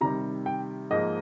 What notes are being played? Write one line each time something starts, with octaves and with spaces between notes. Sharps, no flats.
C3 D#3 G3 A#5
G5
G#2 F3 A#3 D#5